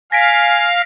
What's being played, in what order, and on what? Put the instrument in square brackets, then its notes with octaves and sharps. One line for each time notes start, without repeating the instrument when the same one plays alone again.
[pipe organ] F5 [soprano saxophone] G#5 [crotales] A#6 B6 D7